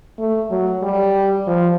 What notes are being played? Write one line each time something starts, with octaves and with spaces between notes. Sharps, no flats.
A3
F#3
G3
F3